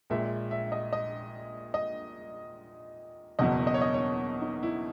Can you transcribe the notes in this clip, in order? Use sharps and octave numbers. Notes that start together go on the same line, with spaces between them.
A#1 A#2 G#3 E5
E5
D#5
D#5
D#5
F#1 E2 B2 F#3 D#5
D#5
C#5
D#5
C#5
D#4
E4